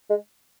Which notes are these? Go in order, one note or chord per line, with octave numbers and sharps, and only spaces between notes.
G#3